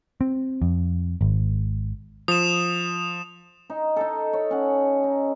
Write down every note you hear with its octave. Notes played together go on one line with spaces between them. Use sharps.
C4
F2
G#1
F3 D#6 E7
D#4
D#4 A4
C#5
C#4 F#5
D#4